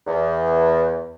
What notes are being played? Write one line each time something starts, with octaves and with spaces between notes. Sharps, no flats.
E2